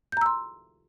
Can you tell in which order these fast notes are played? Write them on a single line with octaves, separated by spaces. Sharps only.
G6 A#5 E6 C6